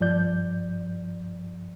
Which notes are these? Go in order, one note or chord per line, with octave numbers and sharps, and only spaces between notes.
G2 F3 D5 G6